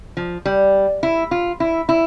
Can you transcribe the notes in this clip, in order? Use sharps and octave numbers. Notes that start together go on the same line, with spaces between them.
F3
G3
E4
F4
E4
E4